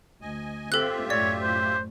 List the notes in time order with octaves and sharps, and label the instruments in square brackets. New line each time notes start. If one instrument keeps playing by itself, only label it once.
[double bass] D2 [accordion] D#5 G#5
[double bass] C4 [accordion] F4 G4 E5 [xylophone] A4 F#6
[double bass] F#2 A2 [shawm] C#5 [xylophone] D5
[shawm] C5